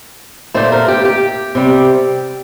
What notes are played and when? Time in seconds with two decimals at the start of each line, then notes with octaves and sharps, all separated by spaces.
0.54 A#2 A3 C5
0.72 A#4
0.88 G4
1.05 G4
1.55 C3 G3